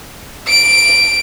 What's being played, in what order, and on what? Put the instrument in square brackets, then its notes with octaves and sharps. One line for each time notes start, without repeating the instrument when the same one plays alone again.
[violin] D7